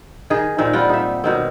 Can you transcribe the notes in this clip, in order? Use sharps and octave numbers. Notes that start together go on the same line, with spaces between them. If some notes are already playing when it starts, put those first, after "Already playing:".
D#3 G#4
A#2 D#3 C4
G3 F4 F#5 G5
D#4 E5
B2 D#3 C4